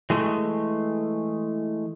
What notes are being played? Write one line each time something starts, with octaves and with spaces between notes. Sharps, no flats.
E3 G#3 A3